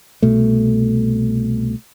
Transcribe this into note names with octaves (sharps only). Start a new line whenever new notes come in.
C2 B2 A3